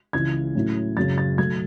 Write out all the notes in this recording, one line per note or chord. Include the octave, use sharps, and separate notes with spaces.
C#2 C#3 E3 G#3 G#6
A2 F#3 C#4 E4
F#1 F#2 C#3 A6
A6
B1 B2 A3 G#6